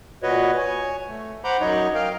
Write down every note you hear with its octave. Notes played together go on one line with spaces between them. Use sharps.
A#2 F#4 B4 C#5 D#5
C#5 G#5
A3
C5 F#5 A#5 B5 D6 G6
F#2 F#3 D#4 C#5 D#5
A#4 D#5 F5 G5